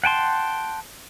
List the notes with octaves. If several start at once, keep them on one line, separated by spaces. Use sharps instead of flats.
F#5 G5 A5 C6